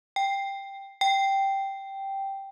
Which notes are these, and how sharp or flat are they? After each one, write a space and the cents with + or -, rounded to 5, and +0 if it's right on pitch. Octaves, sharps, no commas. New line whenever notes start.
G5 +5
G5 -5